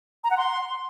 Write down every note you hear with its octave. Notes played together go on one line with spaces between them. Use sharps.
A#5
F#5
C6